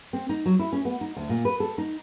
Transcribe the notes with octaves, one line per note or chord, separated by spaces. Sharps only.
C4
D#4
F#3
E4
C#4
B3
D#4
D2
A#2
B4
A4
D#4